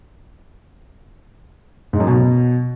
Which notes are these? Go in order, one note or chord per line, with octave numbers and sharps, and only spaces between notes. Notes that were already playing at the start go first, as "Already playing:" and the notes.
G#2
F#2
B2